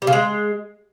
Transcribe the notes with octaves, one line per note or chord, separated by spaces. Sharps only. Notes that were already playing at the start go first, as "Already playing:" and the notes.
G3
C#3
G#3